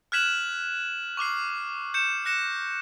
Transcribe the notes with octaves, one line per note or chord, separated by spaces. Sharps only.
F6 F#6 G#6 B6 E7 F#7
C#6 D6 F6 C7
G6 C#7 E7
F#6 A#6 C#7 E7